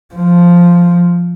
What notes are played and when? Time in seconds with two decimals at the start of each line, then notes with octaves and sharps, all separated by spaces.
0.15 F3